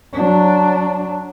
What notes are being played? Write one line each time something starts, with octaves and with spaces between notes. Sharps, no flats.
F#3 D4